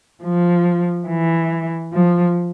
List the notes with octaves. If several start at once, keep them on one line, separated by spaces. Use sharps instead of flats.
F3
E3
F3